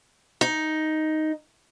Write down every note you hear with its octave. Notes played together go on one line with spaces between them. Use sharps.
D#4